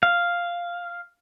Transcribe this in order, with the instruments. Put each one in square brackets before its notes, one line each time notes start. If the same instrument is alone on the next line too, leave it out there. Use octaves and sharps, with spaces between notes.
[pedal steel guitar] F5